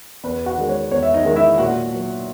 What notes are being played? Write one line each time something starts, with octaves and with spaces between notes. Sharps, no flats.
E2 B4 B5
F#4 F#5
D#3 G#3
C#5
E2 C#5
E5
D#4 D#5
D#3 G#3
E4 E5
A#2 F#4 F#5
F#3